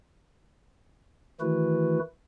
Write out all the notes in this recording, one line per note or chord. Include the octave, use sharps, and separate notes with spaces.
D#3 E3 A3 E4 F#4 B4